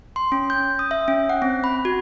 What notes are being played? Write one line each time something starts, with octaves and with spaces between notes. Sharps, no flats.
C6
C#4
G6
D#6
E5
C#4
F#5
C4
B5
F#4